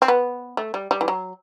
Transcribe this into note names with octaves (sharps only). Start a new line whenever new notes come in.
C4
B3
A3
G3
G3
E3
F#3